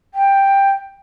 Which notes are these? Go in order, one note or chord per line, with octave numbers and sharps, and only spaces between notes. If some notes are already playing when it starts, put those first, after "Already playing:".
G5